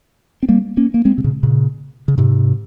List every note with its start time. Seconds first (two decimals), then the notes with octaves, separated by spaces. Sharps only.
0.43 C4
0.49 G3 A#3
0.77 A#3 C#4
0.94 A#3
1.05 G#3 C4
1.18 C3
1.24 A#2 C#3
1.43 A#2 C#3
2.08 C#3
2.18 G#2 C3